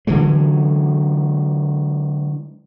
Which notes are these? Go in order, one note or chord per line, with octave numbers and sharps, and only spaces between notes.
D3 E3 F#3 G#3